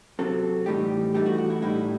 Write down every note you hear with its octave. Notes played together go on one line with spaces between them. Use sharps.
C3 F#3 C4 A4
A2 E3 G3 D#4 G4
G2 E3 A3 D#4 G4
F#4
F#4
E4
A2 G3 D#4 E4